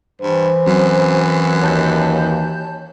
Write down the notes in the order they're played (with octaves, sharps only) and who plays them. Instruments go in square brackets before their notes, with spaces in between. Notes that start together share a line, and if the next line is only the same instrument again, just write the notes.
[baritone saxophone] G2 [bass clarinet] E3 [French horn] C5
[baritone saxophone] F#2 [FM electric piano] F#3 C4
[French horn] D#2 [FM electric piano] C#5 A5 G6